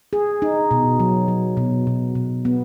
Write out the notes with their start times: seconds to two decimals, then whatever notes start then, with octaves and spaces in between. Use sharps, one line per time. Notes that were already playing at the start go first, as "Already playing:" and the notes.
0.13 G#4
0.42 D#4
0.71 B2
1.00 F#3
1.28 F#3
1.57 B2
1.87 B2
2.15 B2
2.45 B3